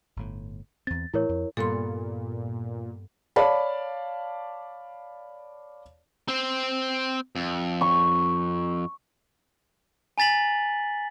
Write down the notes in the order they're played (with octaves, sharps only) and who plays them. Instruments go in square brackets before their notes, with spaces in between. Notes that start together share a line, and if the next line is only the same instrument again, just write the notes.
[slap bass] G1 A2
[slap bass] E2 C4 [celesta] A6
[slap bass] A2 E3 [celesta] E4 A#4 C#5
[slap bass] F2
[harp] G2 B3 C#7 [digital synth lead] A#2 [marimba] A4 C6
[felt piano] C#5 D5 F5 A5 B5
[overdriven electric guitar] C4 C5
F2
[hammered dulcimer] C#6
[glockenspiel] G#5 A#5 A6 B6 F#7